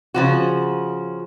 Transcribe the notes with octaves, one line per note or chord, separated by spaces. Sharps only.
C#3 F3 F#4